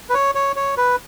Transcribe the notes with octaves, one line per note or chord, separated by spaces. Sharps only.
B4
C#5
C#5
C#5
B4